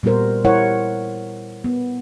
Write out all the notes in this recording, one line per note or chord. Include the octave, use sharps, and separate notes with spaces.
A#2 G3 B3 F#4 A#4 C5
G3 E4 A#4 C5 C#5 F#5
B3